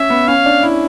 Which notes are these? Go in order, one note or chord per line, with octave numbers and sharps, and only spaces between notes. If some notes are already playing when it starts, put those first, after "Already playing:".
Already playing: C#4 E5
B3
C#4 F5
D4
E4